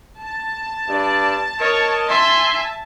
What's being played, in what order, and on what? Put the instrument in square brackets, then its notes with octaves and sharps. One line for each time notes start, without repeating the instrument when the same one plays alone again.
[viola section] A5
[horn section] G2 D5
[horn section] A#4 D#5 [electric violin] C#5
[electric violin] E5 G#5 [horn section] C6